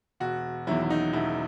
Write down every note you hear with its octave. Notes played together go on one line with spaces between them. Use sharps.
E1 F#4
E2 D#3 F#3 E4
E4
D#4
E1 E4